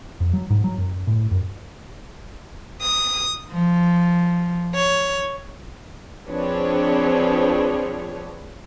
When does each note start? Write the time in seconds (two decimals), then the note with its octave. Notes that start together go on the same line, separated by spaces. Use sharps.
0.20 F2
0.33 F#3
0.50 G#2
0.64 F#3
0.78 F#2
1.07 A2
1.31 F#2
2.81 D#6
3.52 F3
4.76 C#5
6.28 F3 C4 D4 G#4 B4 C#5